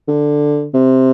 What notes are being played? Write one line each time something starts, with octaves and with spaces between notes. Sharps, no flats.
D3
C3